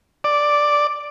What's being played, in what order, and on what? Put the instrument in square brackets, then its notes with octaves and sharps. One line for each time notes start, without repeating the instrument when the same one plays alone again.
[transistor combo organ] D5